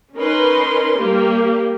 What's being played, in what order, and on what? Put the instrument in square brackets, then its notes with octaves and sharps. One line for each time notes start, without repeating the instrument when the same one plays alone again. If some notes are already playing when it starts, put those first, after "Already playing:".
[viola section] C#4 D#4 A#4 B4 C6
G3 A#3 G4